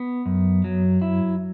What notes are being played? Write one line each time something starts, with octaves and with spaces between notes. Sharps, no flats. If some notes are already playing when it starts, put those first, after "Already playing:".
Already playing: B3
F#2
F#3
E4